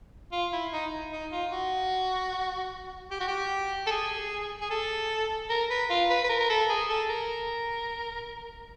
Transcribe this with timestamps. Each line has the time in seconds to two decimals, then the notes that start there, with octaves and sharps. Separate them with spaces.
0.32 F4
0.53 E4
0.72 D#4
1.12 D#4
1.32 F4
1.52 F#4
3.11 G4
3.20 F#4
3.28 G4
3.87 A4
3.91 G#4
4.61 G#4
4.71 A4
5.50 A#4
5.70 B4
5.90 F4
6.10 B4
6.24 B4
6.30 A#4
6.40 A#4
6.50 A4
6.69 G#4
6.89 A4
7.09 A#4